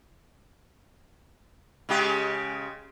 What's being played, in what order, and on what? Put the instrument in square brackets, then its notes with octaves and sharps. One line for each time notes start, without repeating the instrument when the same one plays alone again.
[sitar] C#3 G#3 G4